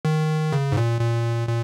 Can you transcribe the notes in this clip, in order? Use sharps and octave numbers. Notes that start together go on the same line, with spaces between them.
D#3
C#3
G#2
A#2
A#2
A#2